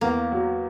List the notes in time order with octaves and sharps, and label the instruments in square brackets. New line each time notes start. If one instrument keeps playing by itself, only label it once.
[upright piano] E2 [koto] A#3
[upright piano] F#3